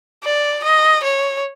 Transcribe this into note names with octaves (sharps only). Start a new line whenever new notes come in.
D5
D#5
C#5